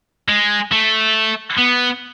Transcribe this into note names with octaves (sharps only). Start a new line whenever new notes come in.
G#3
A3
B3